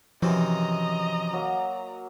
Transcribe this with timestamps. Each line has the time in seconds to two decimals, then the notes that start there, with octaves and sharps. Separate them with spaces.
0.22 F#2 C3 E3 F3 D#5 A#5 D6
1.33 F#3 A#3